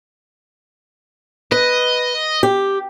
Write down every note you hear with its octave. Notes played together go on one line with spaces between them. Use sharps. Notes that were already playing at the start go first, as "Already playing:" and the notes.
B4 D#5
G4